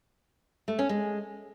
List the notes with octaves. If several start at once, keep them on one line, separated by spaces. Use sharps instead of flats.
A3
C#4
G#3